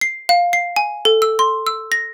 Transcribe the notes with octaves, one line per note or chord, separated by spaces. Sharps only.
C7
F5
C7
G#5
A4
E6
C6
E6
A#6